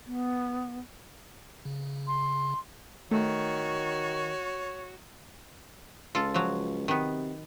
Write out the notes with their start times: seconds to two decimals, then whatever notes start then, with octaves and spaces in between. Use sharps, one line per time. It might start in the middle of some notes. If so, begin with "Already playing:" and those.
0.06 B3
1.65 C#3
2.07 C6
3.11 D#3 A3 F#4 C#5
6.15 C#2 F4 A4
6.34 F3 F#3
6.88 C3 D#3 B3